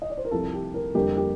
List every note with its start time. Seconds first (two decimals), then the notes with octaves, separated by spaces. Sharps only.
0.02 D#5
0.10 D5
0.17 C5
0.25 A#4
0.31 C2 C3 F3 A4
0.53 G4
0.74 A#4
0.95 F2 D3 G3 A#3 G4
1.17 G4